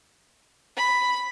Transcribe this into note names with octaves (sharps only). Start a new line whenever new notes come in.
B5